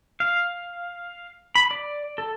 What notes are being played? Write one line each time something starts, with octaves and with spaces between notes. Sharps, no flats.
F5
B5
D5
A4